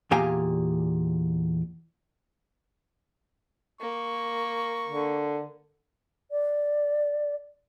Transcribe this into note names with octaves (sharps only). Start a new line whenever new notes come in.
E2 A#2 G4 F5 G#5 A#5
A#3 C#6
D3
D5